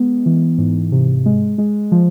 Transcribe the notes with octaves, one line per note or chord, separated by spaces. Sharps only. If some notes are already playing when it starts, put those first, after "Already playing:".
Already playing: G#3 B3
E3
G#2
C3
G#3
G#3
F3